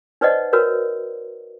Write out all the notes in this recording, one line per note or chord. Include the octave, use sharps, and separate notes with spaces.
D#4 B4 C5 D5 D#5 F#5
F#4 A#4 B4 C#5